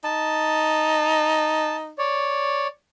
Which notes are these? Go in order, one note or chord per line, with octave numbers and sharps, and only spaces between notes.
D#4 A5
C#5 D5